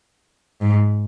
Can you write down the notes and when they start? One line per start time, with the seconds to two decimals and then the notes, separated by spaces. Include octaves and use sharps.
0.61 G#2